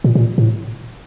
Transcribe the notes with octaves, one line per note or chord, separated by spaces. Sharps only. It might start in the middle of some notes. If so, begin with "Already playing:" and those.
A#2
A#2
A2